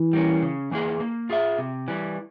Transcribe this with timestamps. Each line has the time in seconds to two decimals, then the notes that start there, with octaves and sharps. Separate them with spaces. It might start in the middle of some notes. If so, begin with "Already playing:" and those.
Already playing: E3
0.13 G3 A#3 C#4
0.42 C#3
0.71 E3 A#3 E4 G#4
1.00 A#3
1.30 F4 G#4 E5
1.58 C3
1.88 E3 G3